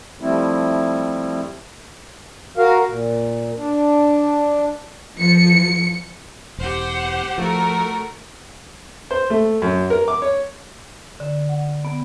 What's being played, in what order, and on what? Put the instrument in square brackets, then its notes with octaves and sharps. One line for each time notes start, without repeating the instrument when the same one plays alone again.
[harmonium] F3 G3 A3 C4 E4
F#4 A#4 F5
A#2
D4
[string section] F3 C#7
[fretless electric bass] E1 [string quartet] G4 C5 F#5
[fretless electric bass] F3 [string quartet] A3 F#4 A#4
[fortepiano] C5
A3
F#2
A#4
D6
C#5
[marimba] D3
F#5
B3